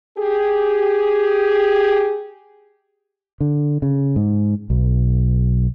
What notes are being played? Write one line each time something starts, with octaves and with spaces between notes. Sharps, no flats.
G4 G#4
D3
C#3
G#2
B1